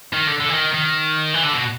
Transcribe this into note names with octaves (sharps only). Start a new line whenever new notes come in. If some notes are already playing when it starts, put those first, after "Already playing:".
D#3
D3
D3
E3
D#3
D#3
E3
D3
B2